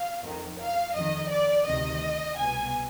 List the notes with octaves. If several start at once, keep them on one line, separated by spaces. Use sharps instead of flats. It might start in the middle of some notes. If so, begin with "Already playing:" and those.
Already playing: F5
F2 D#3
F5
F2 D#3 D#5
D5
D2 C3 D#3 D#5
C2 B2 G#5